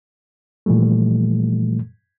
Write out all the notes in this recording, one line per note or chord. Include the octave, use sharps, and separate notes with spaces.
A#2 E3 F3 G3 A3